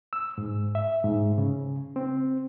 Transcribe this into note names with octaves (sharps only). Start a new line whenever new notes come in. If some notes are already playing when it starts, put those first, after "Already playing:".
E6
G#2
E5
G#2
C#3
C4